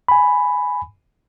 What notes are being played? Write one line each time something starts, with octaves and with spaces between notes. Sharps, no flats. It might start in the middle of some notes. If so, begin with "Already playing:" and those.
G#5 B5